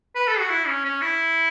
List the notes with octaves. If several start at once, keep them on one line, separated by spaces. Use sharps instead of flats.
B4
A4
F#4
E4
C#4
C#4
E4